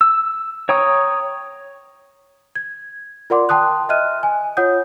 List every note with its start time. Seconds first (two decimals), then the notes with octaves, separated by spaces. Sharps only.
0.01 E6
0.69 C#5 G5 A#5 C#6 D#6
2.55 G#6
3.30 F4 A#4 D5 F#5 C6 D6
3.49 G5 A5 C6 D#6 F#6
3.89 D#5 E5 F6 F#6 D#7
4.23 G#5
4.57 F4 C#5 F#5 D#6 G6